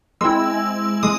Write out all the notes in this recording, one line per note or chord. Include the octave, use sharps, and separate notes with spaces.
G#3 C4 E4 E6
G#3 D#6